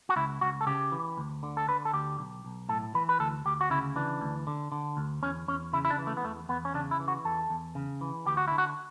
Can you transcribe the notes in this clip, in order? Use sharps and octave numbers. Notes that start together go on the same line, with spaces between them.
F#4
C#2 E4
C#2 F#4
A4
C#3 G4
E3
D2
D3
A4
D3 B4
A4
D2 G4
B1
B1
A2 A4
E3 B4
B4
D2 A4
D2 G4
F#4
C#3 E4
E3 D4
D2
D3
D3
D2
E2 C#4
E2 C#4
C#3 E4
E4
D4
E3
A3
B3
E2 A3
E2 B3
C#4
C#3 D4
E4
E3
F#4
E2 A4
E2
C#3
E3
D2 G4
F#4
D3 E4
F#4